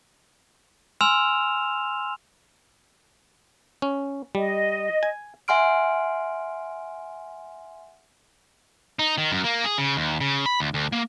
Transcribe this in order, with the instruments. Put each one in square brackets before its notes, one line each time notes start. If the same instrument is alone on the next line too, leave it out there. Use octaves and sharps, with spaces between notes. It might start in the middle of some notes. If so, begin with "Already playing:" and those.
[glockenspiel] G#5 C6 E6 F6 E7 F7
[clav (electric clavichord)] C#4
[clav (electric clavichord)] G3 [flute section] D#5
[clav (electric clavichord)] G#5
[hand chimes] E5 F#5 G#5 C6 F6 D7
[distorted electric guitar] D#4
D#3
F#2
A#3
G#4
C#3
D#2
C#3
B5
D2
D2
A#3